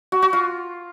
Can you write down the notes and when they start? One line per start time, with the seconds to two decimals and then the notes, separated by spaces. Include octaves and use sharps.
0.12 F#4
0.22 F#4
0.33 F4